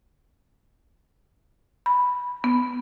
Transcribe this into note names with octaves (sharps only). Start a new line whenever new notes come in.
B5
B3